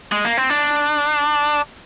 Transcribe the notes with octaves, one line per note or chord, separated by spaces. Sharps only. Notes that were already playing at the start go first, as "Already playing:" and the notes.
G#3
A#3
C4
D4